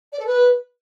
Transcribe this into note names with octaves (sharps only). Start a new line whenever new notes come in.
D5
A4
B4